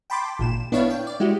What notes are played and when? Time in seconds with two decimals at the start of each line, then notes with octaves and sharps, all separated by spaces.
0.10 G5 A5 B5 C6 D6
0.39 G#1 A#2 E7
0.72 B3 D4 E4 B4 C#5 F5
0.90 G5
1.07 D5
1.20 G#3 E4 F#4 G4